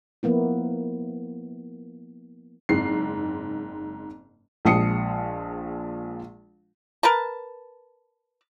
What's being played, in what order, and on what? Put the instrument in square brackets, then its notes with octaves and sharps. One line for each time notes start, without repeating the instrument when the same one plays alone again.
[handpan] F3 A#3 B3 E4
[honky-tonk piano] F#1 G#2 C4 C7
[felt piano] A#1 F3 G#3 D#6 C7 C#7
[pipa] A#4 B4 A5